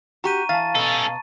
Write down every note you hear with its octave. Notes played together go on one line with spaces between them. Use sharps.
F#4 G4 A#5 C#6 D#7
E3 F5 A5 A6
B2 C#4 A4